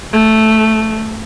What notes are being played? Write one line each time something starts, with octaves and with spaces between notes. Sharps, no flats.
A3